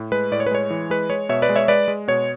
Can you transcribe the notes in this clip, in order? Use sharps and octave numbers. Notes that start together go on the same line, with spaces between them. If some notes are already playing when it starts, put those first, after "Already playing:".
Already playing: A2
G#3 B4
A2 D5
C#5
B4
G#3 C#5
E3
G#3 B4
G#3 C#5
B2 C#5 E5
B4 D5
G#3
C#5 E5
G#3 B4 D5
G#3
B2 C#5